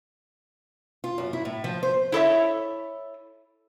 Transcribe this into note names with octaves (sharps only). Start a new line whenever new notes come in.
F4
F#2
E4
A2
F3
C5
E4 A4 C#5 E5